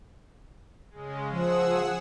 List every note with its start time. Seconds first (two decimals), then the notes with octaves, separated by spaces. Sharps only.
0.90 C#3 G#3
1.31 F3 G#4 F#5 E6